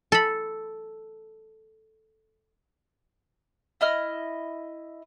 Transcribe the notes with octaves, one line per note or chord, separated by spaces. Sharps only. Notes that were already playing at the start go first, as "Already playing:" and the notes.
A4 B5
E4 D#5 F6